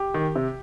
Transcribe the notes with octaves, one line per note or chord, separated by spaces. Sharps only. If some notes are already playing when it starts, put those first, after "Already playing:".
Already playing: G4
D#3
C3